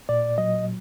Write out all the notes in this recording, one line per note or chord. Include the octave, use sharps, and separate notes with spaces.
A#2 D5
F#3 D#5